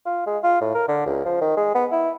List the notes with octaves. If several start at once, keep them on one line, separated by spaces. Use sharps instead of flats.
F4
G#3
F4
A2
A#4
D3
C#2
F3
D#3
G#3
B3
E4